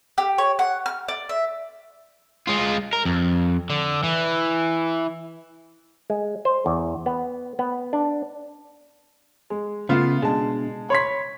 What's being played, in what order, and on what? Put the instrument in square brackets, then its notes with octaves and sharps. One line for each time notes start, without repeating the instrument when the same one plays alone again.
[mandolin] G4
C#5
F#5
F6
D5
E5
[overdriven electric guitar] G#3 F4
A#4
F2
D3
E3
[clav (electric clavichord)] G#3
C5
E2
B3
B3
D4
[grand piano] G#3
[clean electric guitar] C#3 A3 F5 [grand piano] B3 F4
[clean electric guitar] B2 D4 [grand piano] G#3 A5
[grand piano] C#5 C6 B6 [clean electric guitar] B5